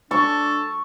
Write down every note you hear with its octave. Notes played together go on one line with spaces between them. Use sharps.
D4 A4 C#6